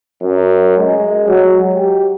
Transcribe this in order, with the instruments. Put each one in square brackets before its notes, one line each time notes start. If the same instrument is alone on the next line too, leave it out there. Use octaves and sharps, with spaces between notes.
[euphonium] F#2
G#3
F#3
G4